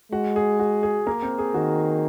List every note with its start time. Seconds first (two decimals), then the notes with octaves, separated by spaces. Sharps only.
0.12 G#3 F#4 F#5
0.36 G#4
0.60 F#4
0.83 G#4
1.07 A#3 A#4
1.23 C4 C5
1.38 G#4
1.54 D#3 F#4